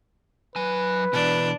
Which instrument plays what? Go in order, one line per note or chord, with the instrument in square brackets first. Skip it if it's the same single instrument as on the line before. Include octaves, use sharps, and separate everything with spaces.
[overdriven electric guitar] F#3 G#5 [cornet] B4
[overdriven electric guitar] B2 E3 [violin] D4